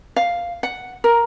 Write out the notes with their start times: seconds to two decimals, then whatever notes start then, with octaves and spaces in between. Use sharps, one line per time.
0.16 F5
0.63 F#5
1.04 A#4